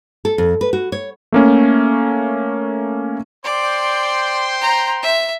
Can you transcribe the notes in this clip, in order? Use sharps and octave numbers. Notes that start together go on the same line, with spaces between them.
A4
F2
B4
F#4
C#5
A3 A#3 C#4
C5 D5 G5 C6
A#5
E5